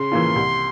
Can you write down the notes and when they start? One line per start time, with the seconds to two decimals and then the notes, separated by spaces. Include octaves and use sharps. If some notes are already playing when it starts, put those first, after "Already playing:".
Already playing: C#3 C6
0.12 E3 A#3 F4
0.35 C2